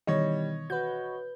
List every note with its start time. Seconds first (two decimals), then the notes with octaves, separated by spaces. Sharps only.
0.07 B2 D#3 E3 G3 C#5 D#5
0.70 F#4 B4 G6